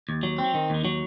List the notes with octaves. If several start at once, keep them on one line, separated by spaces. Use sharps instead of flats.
D#2
F#3
C4
D#3
D#2
F#3